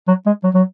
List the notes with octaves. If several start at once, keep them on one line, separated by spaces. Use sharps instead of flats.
F#3
G#3
F#3
F#3